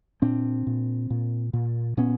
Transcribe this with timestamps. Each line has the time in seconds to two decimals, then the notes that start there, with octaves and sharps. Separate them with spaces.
0.22 A#2 C4 D4
0.67 A#2
1.10 A#2
1.53 A#2
1.97 A#2 B3 C#4